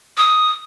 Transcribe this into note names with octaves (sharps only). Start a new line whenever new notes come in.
D#6